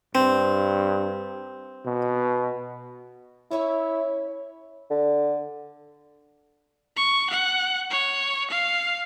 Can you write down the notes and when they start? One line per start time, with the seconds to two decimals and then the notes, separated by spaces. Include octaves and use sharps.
0.15 G2 C4
1.86 B2
3.51 C#4 E4 C#5 E5
4.90 D3
6.97 C#6
7.30 F#5
7.90 C#5
8.50 F5